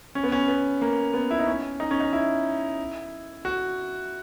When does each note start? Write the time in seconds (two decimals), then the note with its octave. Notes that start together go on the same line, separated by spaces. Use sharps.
0.15 C#4
0.23 B3
0.32 C#4
0.48 B3
0.82 A#3
1.14 B3
1.31 E4
1.39 D#4
1.47 C#4
1.80 D#4
1.91 C#4
2.00 D#4
2.13 E4
3.45 F#4